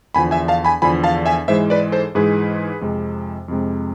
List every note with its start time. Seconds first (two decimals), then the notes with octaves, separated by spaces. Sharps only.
0.14 E2 D3 F3 G#5 B5
0.31 E5 G#5
0.48 F5 A5
0.65 G#5 B5
0.82 E2 D3 F3 G#5 B5
1.04 F5 A5
1.26 E5 G#5
1.48 G#2 E3 G#3 C5 E5
1.70 B4 D5
1.92 A4 C5
2.15 G#2 E3 G#3 G#4 B4
2.81 F2 C3 G#3
3.48 F2 C3 G#3